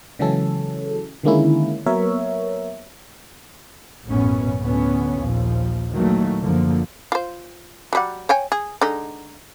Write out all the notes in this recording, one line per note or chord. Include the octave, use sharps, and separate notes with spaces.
C#3 E3 F#3 G#3 C#4 A4
D3 D#3 G#3 A#3 C#4 E4
F#3 A#3 B3 A#4 C#5 E5
A1 F#2 B2 B3 C#4
D2 A2 D3 B3 C#4
A#1 D#2 F3
A#2 D#3 E3 F#3 A3 A#3
F#1 D3 F3 A#3
F4 C5
F#3 G3 F#5
C#5 G5 G#5
G#4
D3 G#3 D#4